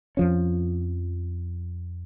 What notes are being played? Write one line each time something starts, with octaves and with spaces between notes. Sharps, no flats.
F2 F3 C#4